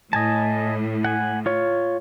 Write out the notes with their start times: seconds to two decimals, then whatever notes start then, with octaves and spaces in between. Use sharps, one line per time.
0.13 A2 D#5 G#5 A5
1.05 F#5 G#5
1.46 F4 C#5